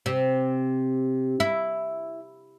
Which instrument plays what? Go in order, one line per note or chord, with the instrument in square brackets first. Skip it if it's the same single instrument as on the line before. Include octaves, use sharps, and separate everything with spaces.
[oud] C3
E4